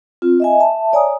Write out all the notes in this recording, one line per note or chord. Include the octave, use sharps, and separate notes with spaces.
C4 F4
D#5 E5 G#5
E5 A5
C#5 D5 G#5 A#5 D#6